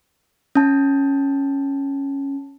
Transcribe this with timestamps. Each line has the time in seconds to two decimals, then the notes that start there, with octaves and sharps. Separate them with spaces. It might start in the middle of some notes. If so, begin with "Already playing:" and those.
0.55 C#4 A5